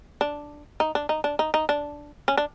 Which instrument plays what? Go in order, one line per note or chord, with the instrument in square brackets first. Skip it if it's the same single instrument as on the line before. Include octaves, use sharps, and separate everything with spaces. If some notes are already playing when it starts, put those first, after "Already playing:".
[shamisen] D4
D#4
D4
D#4
D4
D#4
D#4
D4
C#4
D4